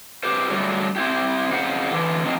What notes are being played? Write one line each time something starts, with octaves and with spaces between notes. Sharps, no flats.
G4 B4 C5
D3 F#3 G3 A3
C4 E4 G4
F2 C#3 F#4 C5 F#5
D3 E3
F3 C4 D#4